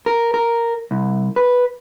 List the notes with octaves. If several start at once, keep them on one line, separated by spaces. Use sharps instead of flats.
A#4
A#4
C2
B4